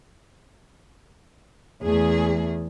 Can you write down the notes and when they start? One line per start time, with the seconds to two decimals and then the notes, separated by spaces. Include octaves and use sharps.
1.83 E2 A3 G#4